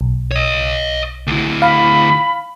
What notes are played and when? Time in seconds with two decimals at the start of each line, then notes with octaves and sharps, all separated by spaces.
0.01 B1
0.31 C#5 D#5
1.27 D2 E4
1.62 F5 B5